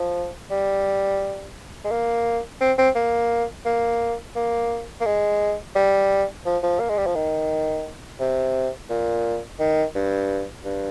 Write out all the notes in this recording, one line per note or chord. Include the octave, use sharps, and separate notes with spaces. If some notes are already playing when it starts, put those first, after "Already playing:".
Already playing: F3
G3
G#3
A#3
C4
C4
A#3
A#3
A#3
A#3
G#3
G3
F3
F3
A#3
G#3
G3
F3
D#3
C3
A#2
D#3
G2
G2